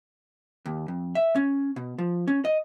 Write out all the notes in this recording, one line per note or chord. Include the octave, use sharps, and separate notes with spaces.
D#2
F2
E5
C#4
B2
F3
C#4
D#5